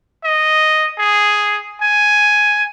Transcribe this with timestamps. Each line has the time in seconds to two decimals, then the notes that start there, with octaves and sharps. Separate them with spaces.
0.24 D#5
0.98 G#4
1.82 G#5